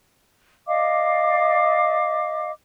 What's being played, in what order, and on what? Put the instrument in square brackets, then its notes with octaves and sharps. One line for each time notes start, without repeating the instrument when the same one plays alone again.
[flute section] D5 D#5 F5 D6